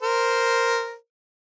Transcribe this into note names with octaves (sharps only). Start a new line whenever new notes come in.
A#4 C5